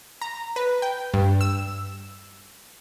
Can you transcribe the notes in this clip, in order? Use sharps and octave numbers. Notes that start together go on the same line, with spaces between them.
A#5
B4
G5
G2
E6